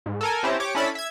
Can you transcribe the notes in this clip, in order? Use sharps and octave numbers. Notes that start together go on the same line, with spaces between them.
G#2
A4 A#4 G#5
C4 C#4 E4 G4 A5 A#5
G4 C#5 D6
C#4 D4 E4 A4 A5 B5
E5 G#6